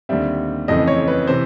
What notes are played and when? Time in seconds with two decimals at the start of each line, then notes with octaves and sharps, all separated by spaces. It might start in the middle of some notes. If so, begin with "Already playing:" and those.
0.09 D#2 D3 G3 C4 E5
0.68 F2 C#3 E3 A3 C4 D#5
0.88 C#5
1.08 B4
1.27 C3 E3 C5